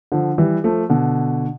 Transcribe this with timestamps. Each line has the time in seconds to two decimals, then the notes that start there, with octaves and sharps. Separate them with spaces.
0.12 D3 F3
0.38 E3 G3
0.64 F3 A3
0.90 B2 D3